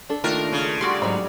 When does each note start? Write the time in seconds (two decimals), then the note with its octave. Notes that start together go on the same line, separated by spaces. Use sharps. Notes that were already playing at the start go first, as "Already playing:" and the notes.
0.09 D4 A4
0.24 D#3 A3 A#3 D4 F4 A#4
0.53 C#3
0.81 G3 F#4 D5 C6
1.02 G#2 F#3 D#4 B5